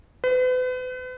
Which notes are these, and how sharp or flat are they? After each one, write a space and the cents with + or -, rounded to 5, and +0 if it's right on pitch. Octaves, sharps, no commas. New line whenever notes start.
B4 +40